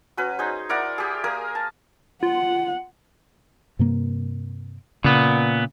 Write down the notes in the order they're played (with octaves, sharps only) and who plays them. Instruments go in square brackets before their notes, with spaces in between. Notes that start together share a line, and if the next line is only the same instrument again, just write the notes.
[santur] F#3 C#4 B4
D#4 G#4 C5
E4 A#4 D5 F#5
G4 G#4
A#3 A#4 G#5 D#6
A5
[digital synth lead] F4 [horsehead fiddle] F#5
[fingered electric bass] G2 C3 A#3
[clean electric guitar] A#2 B3 [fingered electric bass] C#3